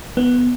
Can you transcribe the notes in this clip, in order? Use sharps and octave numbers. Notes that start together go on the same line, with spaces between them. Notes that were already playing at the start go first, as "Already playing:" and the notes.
B3